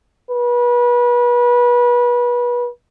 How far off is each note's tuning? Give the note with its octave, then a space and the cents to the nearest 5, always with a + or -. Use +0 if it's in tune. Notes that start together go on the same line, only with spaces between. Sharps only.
B4 -30